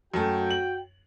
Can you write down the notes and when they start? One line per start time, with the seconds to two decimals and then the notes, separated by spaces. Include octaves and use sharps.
0.14 F#2 A3 F#4 G5
0.51 F#7